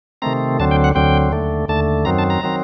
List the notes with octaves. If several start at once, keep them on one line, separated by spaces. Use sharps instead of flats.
C3 D#3 A3 C4 A#5
D2 D3 F#3 C4 A5
G5
F#5
D2 D3 F#3 C4 G5
D#2 D3 A3
D#2 D3 A3 A5
F#2 D#3 F#3 C4 A#5
A5
A#5
D#3 F#3 C4